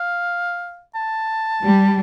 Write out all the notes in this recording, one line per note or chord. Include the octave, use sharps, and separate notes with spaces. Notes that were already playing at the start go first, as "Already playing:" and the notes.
Already playing: F5
A5
G3